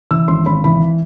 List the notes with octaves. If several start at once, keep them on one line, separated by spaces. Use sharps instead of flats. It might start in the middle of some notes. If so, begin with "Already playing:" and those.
E3 E6
G#1 C6
G#1 B5
E3 B5